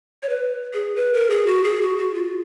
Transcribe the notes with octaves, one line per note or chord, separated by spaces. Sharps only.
C#5
B4
G#4
B4
A#4
G#4
F#4
G#4
F#4
F#4
F4